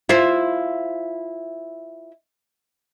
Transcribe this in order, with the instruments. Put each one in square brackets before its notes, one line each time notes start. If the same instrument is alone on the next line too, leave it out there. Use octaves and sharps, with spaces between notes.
[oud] E4 F4 C5